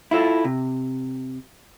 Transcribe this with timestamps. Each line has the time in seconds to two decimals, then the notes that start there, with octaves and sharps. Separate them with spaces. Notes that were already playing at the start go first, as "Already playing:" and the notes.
0.11 E4 F4 A4
0.45 C3